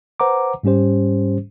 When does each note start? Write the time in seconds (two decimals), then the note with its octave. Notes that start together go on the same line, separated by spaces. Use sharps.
0.20 B4 C5 F#5 A#5 D6
0.63 G#2 G3 C#4 G4 C5